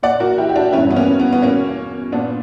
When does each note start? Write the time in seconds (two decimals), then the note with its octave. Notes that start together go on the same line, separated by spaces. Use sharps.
0.03 A#2 D5 F#5
0.20 F#4 A#4
0.38 E4 G4
0.49 G4
0.55 D4 F#4
0.72 E3 C#4 E4
0.78 G2
0.91 B3
0.96 A#3 C#4
1.20 B3
1.33 B3
1.42 E2 B2 A#3 C#4
2.12 A#2 B3 D4